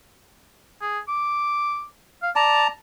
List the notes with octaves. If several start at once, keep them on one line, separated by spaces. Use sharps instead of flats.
G#4
D6
F5
D5 A5 A#5